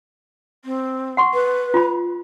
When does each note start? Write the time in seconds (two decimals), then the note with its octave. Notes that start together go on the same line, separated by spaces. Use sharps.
0.65 C4
1.17 F#5 C6 C#6
1.34 B4
1.74 F4 B5